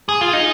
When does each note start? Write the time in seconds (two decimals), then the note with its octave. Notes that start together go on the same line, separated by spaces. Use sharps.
0.09 G#4
0.21 F4
0.33 D#4